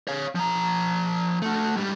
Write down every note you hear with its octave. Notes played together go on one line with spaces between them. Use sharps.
C#5 F5
F3 A#5
A3 F#4
G#2 G3